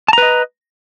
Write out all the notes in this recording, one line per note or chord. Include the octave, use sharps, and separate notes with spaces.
B4 D#5 A5 A#5